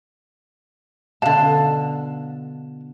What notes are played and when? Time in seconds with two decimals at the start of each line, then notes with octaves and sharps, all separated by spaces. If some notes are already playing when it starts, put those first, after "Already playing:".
1.22 B2 D3 F5 A5